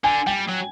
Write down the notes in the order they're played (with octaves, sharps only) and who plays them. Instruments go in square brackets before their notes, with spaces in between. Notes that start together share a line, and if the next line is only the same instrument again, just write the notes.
[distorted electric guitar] D3 [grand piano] G#5
[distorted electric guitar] G3 [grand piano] G5
[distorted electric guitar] F#3